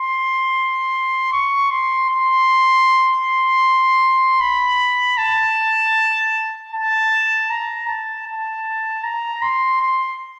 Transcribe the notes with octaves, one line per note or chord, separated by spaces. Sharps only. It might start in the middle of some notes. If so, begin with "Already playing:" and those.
Already playing: C6
C#6
C6
C6
B5
A5
A5
A#5
A5
A5
A#5
C6
C6